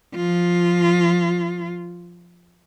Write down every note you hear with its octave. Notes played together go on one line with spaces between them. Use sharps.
F3 F4